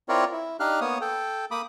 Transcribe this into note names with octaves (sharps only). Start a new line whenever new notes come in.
C4 E4 F4 A#4 C#5 D5
E4
D4 D#4 G4 F5 F6 F#6
A#3 B3 C#5 D#6
A4 G5
A#3 B5 D6 D#6